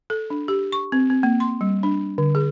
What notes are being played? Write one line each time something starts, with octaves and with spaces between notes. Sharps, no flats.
A4
D4
G4
C#6
C4
C4
A#3
C6
G3
D4
D3
G#4